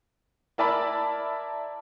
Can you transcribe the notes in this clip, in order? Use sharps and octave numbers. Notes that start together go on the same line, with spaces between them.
E4 A#4 D5 E5 A5 B5